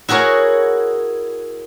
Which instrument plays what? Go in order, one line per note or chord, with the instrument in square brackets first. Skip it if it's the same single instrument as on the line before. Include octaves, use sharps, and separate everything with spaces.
[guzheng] E4 F#4 G#4 A#4 C#5